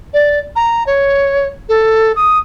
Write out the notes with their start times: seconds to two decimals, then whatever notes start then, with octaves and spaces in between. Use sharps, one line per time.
0.13 D5
0.56 A#5
0.87 C#5
1.69 A4
2.16 D#6